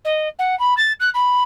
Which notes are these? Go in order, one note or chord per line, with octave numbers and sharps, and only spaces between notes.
D#5
F#5
B5
A6
F#6
B5